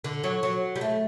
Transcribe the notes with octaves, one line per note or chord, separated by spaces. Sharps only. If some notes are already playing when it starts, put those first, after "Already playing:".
D3
F#3
F#3
G3
A3